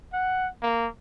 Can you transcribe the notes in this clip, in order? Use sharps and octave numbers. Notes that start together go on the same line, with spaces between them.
F#5
A#3